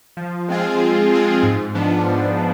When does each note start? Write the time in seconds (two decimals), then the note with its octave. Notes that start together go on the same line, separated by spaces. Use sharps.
0.17 F3
0.48 G#3 C4 F4 G#4
0.80 F3
1.12 G#3 C4 F4 G#4
1.43 G#2
1.75 F3 B3 D4
2.07 G#2
2.38 F3